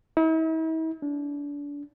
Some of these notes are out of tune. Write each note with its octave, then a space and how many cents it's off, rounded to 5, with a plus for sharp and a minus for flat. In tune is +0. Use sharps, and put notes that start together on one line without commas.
E4 -45
D4 -30